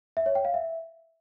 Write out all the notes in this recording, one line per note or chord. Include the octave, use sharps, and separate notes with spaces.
E5
C#5
G5
F5
E5